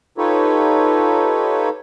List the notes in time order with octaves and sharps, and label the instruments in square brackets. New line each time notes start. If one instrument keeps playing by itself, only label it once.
[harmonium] D#4 F4 G4 A4 B4 C#5